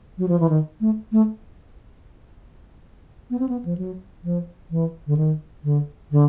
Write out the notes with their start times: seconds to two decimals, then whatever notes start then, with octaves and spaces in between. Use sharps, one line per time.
0.18 F#3
0.28 F3
0.40 E3
0.49 D#3
0.81 A3
1.12 A3
3.30 B3
3.39 C4
3.49 B3
3.65 F3
3.78 F#3
4.24 F3
4.71 E3
5.07 D3
5.17 D#3
5.64 D3
6.11 D3